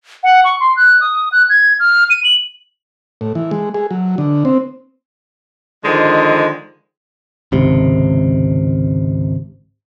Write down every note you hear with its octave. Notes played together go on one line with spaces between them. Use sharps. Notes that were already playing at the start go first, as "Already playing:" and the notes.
F#5
C#6
C6
F#6
D#6
F#6
G#6
F6
D#7
F#7
A2
E3
G#3
G#4
F#3
D3
C4
D3 D#3 F3 G#3
G#1 C#2 C3